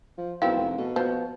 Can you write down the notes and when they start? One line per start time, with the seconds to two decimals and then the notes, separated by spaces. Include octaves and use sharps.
0.18 F3
0.42 B1 B3 C4 E4 F#4 A#4 F5
0.56 F1
0.78 B2 A4
0.96 F3 B3 F#4